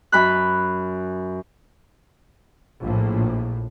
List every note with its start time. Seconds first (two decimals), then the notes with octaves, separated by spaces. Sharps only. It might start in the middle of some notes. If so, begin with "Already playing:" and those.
0.12 F#2 B5 F#6
2.81 A#1 A2